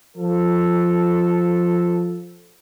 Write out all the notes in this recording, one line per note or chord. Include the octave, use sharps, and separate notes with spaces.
F3 A4